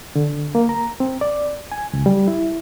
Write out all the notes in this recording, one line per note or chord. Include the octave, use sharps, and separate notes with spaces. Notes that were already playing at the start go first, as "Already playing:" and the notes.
D3
A#3
A#5
C4
D5
G#5
C#2
G3
E4